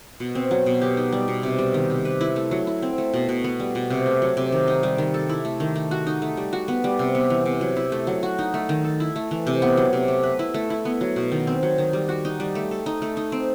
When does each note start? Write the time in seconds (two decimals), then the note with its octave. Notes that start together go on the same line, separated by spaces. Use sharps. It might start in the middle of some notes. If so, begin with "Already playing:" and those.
0.20 B2
0.35 C4
0.51 F#3
0.66 B2
0.82 G4
0.97 D#4
1.13 G3
1.28 B2
1.43 C3
1.59 G3
1.74 D#3
1.90 C3
2.05 B4
2.21 E4
2.36 A3
2.51 F#3
2.67 E4
2.82 C4
2.98 A3
3.14 B2
3.29 B2
3.44 B3
3.60 G3
3.75 B2
3.90 C3
4.06 A3
4.22 F#3
4.37 C3
4.52 D#3
4.68 D#4
4.83 G3
4.98 D#3
5.14 A4
5.29 E4
5.45 A3
5.60 D#3
5.76 A3
5.91 F#4
6.07 D#4
6.22 A3
6.37 G3
6.53 F#4
6.68 B3
6.84 G3
6.99 C3
7.15 B3
7.30 E3
7.46 C3
7.61 F#3
7.77 E4
7.92 A3
8.07 F#3
8.23 F#4
8.39 D#4
8.54 A3
8.69 D#3
8.84 A4
9.00 E4
9.16 A3
9.31 E3
9.47 C3
9.62 B3
9.77 F#3
9.93 C3
10.08 A3
10.23 B4
10.39 E4
10.54 A3
10.70 E4
10.85 B3
11.01 F#3
11.16 B2
11.32 D#3
11.47 C4
11.63 F#3
11.78 D#3
11.93 G3
12.09 F#4
12.25 D#4
12.40 G3
12.55 A3
12.71 A4
12.86 D#4
13.02 A3
13.17 D#4
13.32 C4